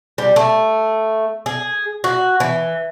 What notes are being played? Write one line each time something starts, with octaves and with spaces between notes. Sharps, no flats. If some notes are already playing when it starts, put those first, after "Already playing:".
G3
A3
G#4
F#4
E3